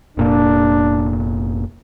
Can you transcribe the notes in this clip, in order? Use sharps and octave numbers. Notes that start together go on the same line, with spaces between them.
F1 A#2 A#3 D4